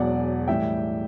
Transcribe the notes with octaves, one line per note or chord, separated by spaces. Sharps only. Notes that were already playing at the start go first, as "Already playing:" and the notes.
Already playing: E1 E2 B2 F#3 D5 F#5
A2 E3 G3 E5 G5